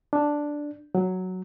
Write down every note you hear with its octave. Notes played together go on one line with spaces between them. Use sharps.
D4
F#3